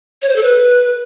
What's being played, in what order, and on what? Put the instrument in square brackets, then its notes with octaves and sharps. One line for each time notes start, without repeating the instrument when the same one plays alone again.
[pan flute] C#5
C5
A4
B4